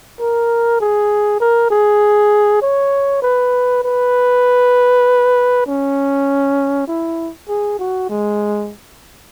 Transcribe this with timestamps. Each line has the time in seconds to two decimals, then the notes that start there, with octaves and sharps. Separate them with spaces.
0.20 A#4
0.80 G#4
1.40 A#4
1.71 G#4
2.62 C#5
3.22 B4
3.84 B4
5.67 C#4
6.87 E4
7.49 G#4
7.79 F#4
8.09 G#3